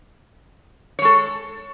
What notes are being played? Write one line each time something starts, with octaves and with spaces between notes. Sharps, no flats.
G#3 A4 C#5